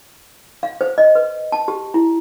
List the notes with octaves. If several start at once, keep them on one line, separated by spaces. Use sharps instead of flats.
F5
C5
D#5
B4
A5
G4
E4